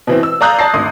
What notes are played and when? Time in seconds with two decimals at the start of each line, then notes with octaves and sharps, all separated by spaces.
0.07 B2 E3 C4
0.23 E6
0.41 D5 F5 A#5 D#6 F#6 G6
0.59 D5 A5 A#6 C7
0.74 G#1 D2 D#6